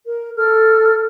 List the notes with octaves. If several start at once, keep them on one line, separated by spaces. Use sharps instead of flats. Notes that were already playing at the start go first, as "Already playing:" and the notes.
A#4
A4 F6